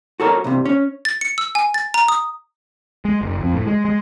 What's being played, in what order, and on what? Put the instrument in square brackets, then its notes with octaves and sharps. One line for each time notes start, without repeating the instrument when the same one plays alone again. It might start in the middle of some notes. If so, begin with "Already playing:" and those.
[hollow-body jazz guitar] F#4 A4 A#4 C#5
C2 G2 C3
C#4
[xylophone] A6
C#7
E6
G#5
A6
A#5
D#6
[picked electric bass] G#3
F#1
F2
A2
G#3
G#3